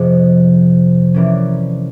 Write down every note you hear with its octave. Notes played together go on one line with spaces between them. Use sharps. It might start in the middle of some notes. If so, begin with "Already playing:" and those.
Already playing: F2 C3 F3 G#3 B3
E3 G3 A#3 C#4